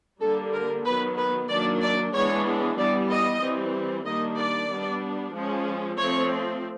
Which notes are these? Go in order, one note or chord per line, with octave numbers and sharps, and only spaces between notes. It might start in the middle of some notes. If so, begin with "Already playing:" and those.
D3 G3 A#3 A4
A#4
D#3 F#3 B3 B4
B4
D#3 F#3 A#3 D4 D5
D5
E3 G#3 B3 D4 C#5
E3 G3 B3 D5
D#5
E3 G3 C4
D#3 G3 A#3 D4 D#5
D5
G3 B3 D4
F3 G#3 C#4
F3 A3 C4 C#5